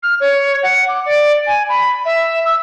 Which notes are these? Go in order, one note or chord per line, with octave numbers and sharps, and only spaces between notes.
F6
C#5
F#5
D6
D5
G#5
B5
E5
E6